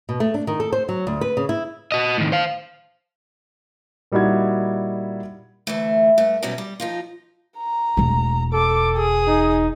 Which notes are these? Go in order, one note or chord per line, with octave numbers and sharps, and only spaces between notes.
B2
A3
D4
D#3
A4
C5
F#3
D2
B4
C#3
E4
F#4 D#5
A2 D#3
C5 F5
A#2 G3 D#4 E4 F#4 G#6
D2 E3 A3
G2 A3
B2 F#3 G3 C4 C#4 E4
G3
F3 D#4 F4
A#5
E1 A3
A4 D6
G#4 D#6
D#4